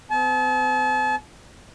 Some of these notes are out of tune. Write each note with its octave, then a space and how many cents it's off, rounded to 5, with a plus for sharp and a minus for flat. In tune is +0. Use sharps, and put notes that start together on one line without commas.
C4 -45 A5 -40